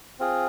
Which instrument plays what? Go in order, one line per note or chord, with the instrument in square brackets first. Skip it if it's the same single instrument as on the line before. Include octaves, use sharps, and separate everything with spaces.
[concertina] C4 F4 G#4